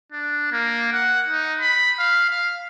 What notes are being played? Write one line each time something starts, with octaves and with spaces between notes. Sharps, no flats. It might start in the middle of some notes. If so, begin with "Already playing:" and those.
D4
A#3
F#5
D#4
B5
F5
F5